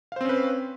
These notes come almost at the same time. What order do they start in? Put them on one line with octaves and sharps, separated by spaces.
F5 C5 C4 C#4 B4